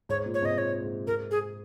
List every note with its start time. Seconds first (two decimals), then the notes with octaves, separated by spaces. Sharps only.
0.09 G#2 C#5
0.26 A#2
0.34 C#5
0.41 G#2 C3 D#5
0.57 A#2 C#5
0.83 G#2
1.07 G#2 A#4
1.31 G#4